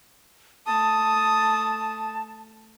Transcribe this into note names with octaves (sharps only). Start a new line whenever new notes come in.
A3 A5 D#6